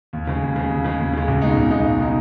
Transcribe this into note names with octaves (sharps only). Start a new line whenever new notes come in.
D#2
C#3 G#3
D#2
C#3 G#3
D#2
C#3 G#3
D#2
C#3 G#3
C#2
B2 G#3 D#4
C#2
B2 G#3 D#4
C#2
B2 G#3 D#4